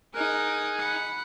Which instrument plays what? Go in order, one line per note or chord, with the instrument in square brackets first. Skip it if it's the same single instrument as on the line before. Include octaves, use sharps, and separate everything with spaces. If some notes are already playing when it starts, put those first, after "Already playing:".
[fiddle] D#4 G#4 [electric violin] A#4 F#6
[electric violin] F#5 B5